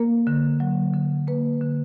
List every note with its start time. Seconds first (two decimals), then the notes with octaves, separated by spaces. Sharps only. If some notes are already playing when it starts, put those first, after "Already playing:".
Already playing: A#3 A#4
0.27 D3
0.60 F#3
0.94 D3
1.27 A#3 B4
1.61 D3